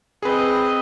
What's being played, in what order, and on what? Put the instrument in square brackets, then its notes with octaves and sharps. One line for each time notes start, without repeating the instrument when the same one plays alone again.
[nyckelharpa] C4 D#5 [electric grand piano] G#4 B4